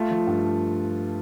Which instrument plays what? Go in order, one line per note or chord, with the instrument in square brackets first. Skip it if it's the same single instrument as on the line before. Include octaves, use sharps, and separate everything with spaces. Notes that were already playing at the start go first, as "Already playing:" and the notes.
Already playing: [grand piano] A3 F4
F3
G2